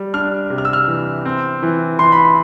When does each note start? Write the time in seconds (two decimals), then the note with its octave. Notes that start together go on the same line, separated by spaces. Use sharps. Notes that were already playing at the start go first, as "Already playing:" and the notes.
Already playing: G3
0.14 D4 F6
0.50 C3
0.58 F6
0.65 E6
0.73 F6
0.88 E3
1.25 C4
1.63 E3
1.99 E3 C6
2.12 B5
2.25 C6